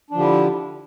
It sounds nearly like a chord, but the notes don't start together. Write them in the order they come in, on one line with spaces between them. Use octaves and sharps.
D4 F3 D3 G4 E4